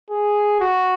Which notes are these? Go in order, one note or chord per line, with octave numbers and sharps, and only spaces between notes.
G#4
F#4